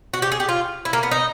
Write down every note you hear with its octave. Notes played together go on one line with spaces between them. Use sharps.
F#4
G4
G#4
G4
F4
E4
A#3
B3
D#4